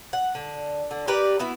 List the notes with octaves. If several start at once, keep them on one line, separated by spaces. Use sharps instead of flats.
F#5
D3
D3
G4 A#4 B4 D5
B3 E4 F#4